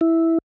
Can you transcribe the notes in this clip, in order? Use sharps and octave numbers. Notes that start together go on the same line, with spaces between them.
E4